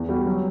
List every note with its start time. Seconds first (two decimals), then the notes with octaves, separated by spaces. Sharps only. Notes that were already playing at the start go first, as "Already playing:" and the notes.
Already playing: E2
0.09 G3 F#4
0.27 F#3